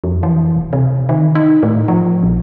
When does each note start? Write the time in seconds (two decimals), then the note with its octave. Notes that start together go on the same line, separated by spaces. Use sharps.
0.04 F2
0.23 E3
0.56 D1
0.73 C3
1.09 D#3
1.35 D#4
1.63 A2
1.88 F3
2.23 A#1